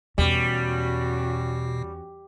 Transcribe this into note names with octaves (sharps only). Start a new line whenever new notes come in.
E2 B2 G3 C#4 F#4